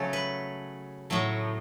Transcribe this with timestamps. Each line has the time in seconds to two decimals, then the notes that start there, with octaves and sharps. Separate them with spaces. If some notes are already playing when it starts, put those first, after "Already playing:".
Already playing: C#3 F#3 A3 A4 C#5
0.13 B4
1.10 A2 F#3 A3